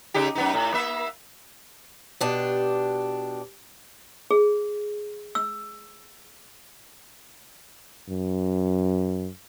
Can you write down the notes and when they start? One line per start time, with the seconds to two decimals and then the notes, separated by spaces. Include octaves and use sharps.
0.14 C#3 D#4 G4
0.35 F#2 B3 D#4
0.54 A2
0.74 A#3 E5
2.21 B2 D4 G4
4.31 G#4
5.35 E6
8.09 F#2